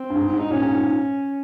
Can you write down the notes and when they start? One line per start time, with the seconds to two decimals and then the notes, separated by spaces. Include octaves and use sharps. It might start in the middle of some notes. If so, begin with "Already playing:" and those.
Already playing: C4
0.10 G2
0.16 G#2
0.33 G#2
0.39 D#4
0.50 A#2 C#4
0.63 G#2
0.74 G#2